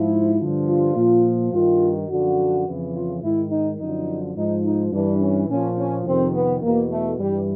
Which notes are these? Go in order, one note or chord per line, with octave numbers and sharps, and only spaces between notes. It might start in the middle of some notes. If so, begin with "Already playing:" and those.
Already playing: G#2 F3 E4
G2 D3 F3
F4
A#2 F3
G2 D#3 F4
F#2 D3 F3 F#4
F2 C#3 E3
F4
G#2 D#3 E4
D#4
F#2 D3 F3 D#4
G#2 F3 D#4
D#4
G2 E3 D4
C#4
A#2 F3 C#4
C#4
F2 C3 D#3 C4
B3
E2 B2 A#3
A3
G2 E3 G3